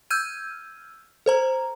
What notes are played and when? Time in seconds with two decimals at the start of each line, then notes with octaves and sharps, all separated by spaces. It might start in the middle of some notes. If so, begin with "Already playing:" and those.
0.10 E6 F6 G6 G#6 D#7
1.26 A4 C5 A#5